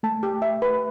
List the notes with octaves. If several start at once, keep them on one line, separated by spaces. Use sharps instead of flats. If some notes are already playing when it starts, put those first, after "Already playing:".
A3 A5
G4
E5
B4